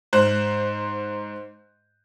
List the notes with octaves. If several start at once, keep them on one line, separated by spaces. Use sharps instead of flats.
G#2 C5 F#6